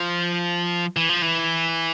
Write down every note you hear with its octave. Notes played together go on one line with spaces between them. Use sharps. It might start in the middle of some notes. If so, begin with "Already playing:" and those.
Already playing: F3
E3
F3
E3